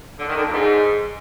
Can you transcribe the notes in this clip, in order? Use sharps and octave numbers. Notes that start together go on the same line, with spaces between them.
D3
D#3
D3
A#2
G#2